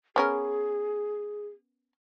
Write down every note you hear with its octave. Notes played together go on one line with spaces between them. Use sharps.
B3 C#4 G#4 A#4